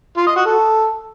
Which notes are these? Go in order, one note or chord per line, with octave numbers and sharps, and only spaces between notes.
F4
D#5
F#4
A4